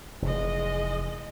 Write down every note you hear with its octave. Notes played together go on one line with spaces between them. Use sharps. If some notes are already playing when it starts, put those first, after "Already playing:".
F1 E3 G#3 D#5